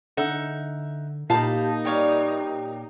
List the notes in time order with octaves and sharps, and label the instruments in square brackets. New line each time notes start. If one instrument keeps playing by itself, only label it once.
[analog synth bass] D3 [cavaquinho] D#4 E5 F#5
[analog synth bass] A#2 [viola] D#4 A#4 [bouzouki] G4 G5 [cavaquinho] F5 A5 B5
[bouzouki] G3 [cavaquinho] G4 C#5 F5